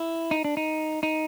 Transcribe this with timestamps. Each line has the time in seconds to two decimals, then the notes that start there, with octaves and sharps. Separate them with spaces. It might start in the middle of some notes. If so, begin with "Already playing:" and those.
Already playing: E4
0.31 D#4
0.44 D4
0.57 D#4
1.03 D#4